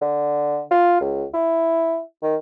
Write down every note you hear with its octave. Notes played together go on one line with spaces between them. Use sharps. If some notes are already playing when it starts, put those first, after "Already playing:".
D3
F4
C#2
E4
D#3